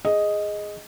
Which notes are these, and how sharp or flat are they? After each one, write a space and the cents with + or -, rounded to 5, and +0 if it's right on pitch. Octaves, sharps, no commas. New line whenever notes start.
G#4 +0 D#5 +0